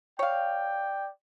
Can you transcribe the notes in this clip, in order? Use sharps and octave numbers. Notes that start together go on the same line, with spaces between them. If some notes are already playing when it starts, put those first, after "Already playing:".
C#5 D5 F5 G5